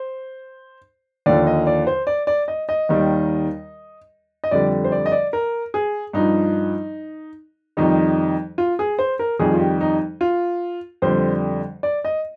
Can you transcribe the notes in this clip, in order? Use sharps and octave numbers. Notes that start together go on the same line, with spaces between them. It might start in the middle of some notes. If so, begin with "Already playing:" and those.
Already playing: C5
D#2 D3 F3 D5
D#5
D5
C5
D5
D5
D#5
D#5
D#2 D#3 G3
D#5
F2 D3 G3 D5
C5
D5
D#5
D5
A#4
G#4
G2 F3 D#4
F2 D#3 G3 D#4
F4
G#4
C5
A#4
F2 D#3 G3 G#4
F4
G4
D#4
F4
F2 D3 G3 C5
D5
D#5